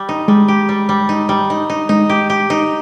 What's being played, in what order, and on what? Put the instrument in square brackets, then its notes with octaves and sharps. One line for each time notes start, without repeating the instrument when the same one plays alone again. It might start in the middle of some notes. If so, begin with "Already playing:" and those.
Already playing: [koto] G3
D#4
[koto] G3 [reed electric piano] G#3
[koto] G4
G3
G3
D#4
G3
D#4
D#4
[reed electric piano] G#3 [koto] D#4
[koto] G4
G4
D#4